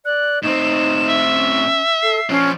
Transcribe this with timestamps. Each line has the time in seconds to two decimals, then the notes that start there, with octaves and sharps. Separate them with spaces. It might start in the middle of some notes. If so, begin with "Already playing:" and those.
0.05 D5 F#6
0.43 A2 C4 D#4 E7
1.09 E5
1.34 C#4
2.03 A4 C7
2.29 F3 C#4 D4